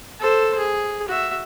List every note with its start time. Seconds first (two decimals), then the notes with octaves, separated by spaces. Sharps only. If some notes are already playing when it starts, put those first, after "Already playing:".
0.19 A4 C5
0.57 G#4
1.08 F#4 E5